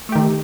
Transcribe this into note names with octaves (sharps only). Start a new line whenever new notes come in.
D#3 A3 G4